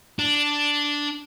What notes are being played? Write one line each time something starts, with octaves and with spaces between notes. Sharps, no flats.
D4